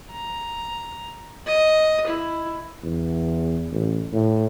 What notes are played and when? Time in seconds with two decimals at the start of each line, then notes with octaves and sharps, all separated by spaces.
0.12 A#5
1.47 D#5
2.07 E4
2.83 E2
3.72 A1
4.13 A2